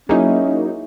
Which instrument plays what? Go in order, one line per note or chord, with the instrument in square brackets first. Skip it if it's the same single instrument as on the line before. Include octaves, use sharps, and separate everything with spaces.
[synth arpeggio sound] F#3 A#3 D#4 [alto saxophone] C#4 [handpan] E4 F#4 G#4